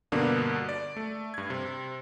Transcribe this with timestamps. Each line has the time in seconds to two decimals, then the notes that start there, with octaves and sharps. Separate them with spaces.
0.12 G2 B2 D3 A#3 B3 D4
0.69 D5
0.97 A3
1.34 G2 G#6
1.50 C3